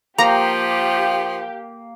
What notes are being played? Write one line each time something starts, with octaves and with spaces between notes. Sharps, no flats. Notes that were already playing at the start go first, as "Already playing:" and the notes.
F3 A#3 G4 A#5